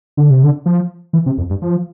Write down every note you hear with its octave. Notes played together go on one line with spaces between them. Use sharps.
D3
C3
D3
F3
E3
C3
F2
G2
F3